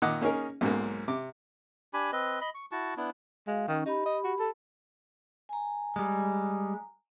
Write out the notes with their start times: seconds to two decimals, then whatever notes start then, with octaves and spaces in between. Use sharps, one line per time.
0.02 A#2 D#3 D#5 F#5 D6
0.21 A#3 C#4 D#4 G#4 A#4
0.61 B1 G#2 F#3 A#3
1.08 C3 D6
1.93 D4 G4 G#5 B5
2.12 C4 B4 D#5
2.41 D#5 B5
2.55 C#6
2.72 E4 F#4 A5 C#6
2.97 B3 D4 E4
3.47 G#3 F#4 F5
3.68 D#3 C#4 D#4
3.86 D#4 G4 B5
4.06 D#5
4.24 F#4
4.39 A4
5.49 G#5 A#5
5.96 G3 G#3